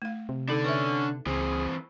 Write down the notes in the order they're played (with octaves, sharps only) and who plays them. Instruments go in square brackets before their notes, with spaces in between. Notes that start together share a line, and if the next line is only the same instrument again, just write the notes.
[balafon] A3 F5
[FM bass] C3
[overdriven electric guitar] D3 D4 [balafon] D#4 A4
[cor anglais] C#4 [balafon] B4 E5
[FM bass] C#2 [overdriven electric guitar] E3 C4 [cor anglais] G#4